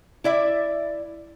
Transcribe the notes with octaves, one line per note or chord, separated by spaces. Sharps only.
E4 D5 E5